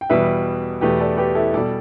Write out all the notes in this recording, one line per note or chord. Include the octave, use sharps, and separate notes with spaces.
G5
E2 B2 G3 B4 E5
E2 B2 A3 G4 B4
A4 D5
G4 B4
E4 A4
B2 G3 A4 D5